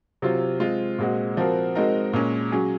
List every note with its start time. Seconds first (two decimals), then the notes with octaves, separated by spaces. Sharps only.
0.22 C3 F#3 C4 F4
0.60 G#3 C4 F4
0.99 A#2 G#3 C4 F#4
1.37 F3 C4 F#4 A#4
1.75 G#3 C4 D#4 F#4 A#4
2.13 A#2 G#3 C#4
2.52 F#3 C#4 G#4